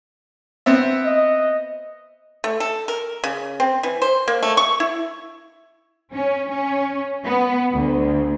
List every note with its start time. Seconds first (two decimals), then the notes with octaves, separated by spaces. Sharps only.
0.66 B3 C4 E5
1.06 D#5
2.44 A3
2.60 A4
2.88 A#4
3.24 C#3
3.60 C4
3.83 E3
4.02 C5
4.28 A#3
4.43 A3
4.57 C#6
4.80 E4
6.13 C#4
6.50 C#4
7.27 B3
7.75 D2